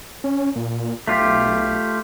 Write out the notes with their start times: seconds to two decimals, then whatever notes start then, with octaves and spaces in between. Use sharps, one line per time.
0.24 C#4
0.56 A#2
1.07 B1 A3 F4 G4